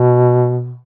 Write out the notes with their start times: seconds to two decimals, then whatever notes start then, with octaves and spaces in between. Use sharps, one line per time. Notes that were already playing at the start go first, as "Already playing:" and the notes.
Already playing: B2